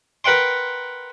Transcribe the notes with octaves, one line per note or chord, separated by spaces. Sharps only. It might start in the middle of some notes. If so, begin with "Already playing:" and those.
A#4 B4 F#5 G5 C6